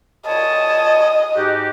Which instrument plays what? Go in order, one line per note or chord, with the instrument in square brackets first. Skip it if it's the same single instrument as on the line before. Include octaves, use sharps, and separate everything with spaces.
[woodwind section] A#2 C#5 A5 [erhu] D#5
[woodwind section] G#2 F#4 G4